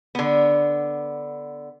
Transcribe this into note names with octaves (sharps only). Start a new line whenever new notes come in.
D3 B3